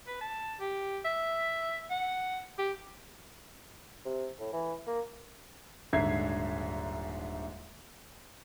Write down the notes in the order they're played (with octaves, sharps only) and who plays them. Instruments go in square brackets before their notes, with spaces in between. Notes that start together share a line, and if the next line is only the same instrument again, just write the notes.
[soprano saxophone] B4
A5
G4
E5
F#5
G4
[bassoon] C3
A2
E3
A#3
[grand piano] D#1 G#2 D3 E5 G#6 C7